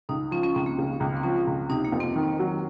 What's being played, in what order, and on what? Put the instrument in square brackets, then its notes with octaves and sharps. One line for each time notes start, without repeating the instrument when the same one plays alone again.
[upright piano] C#2 [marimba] D#4
[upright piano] F3 [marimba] C#4
[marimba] C#4
[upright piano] C#2 [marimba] C4
[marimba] A#3
[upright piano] C#3
C#2
[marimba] C4
[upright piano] F3 [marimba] C#4
[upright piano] C#2
[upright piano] C3 [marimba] D#4
[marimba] A#3
[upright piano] F2
[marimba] C4
[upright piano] D#3
F#3